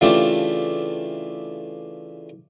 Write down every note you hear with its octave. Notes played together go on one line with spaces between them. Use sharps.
C#3 E3 A3 D4 F4 G4